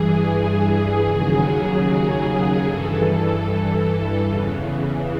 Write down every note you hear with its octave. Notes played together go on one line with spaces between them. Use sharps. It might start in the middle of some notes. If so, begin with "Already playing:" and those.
Already playing: G2 E3 G#4
D#2 C#3 F#3
G2 E3 A4
E2 C#3 E3